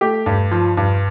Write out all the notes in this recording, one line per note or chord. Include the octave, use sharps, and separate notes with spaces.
A3 G4
G2
F3
G2